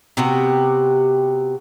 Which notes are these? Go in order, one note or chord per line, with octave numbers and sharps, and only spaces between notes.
C3 B3 F#4 G4